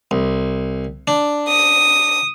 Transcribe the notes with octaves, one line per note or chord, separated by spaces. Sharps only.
C2
D4
D#6